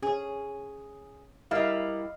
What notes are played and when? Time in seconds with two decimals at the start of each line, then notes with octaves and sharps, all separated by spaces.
0.03 C#4 G#4
1.51 G3 E4 A#4 D#5 F5